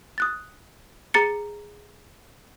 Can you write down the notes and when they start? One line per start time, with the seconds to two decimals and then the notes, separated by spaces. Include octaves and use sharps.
0.18 D#6 F#6 A6
1.14 G#4 A#5 A6 C#7